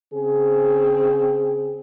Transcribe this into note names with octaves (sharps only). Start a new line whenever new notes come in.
C#3 C4 G#4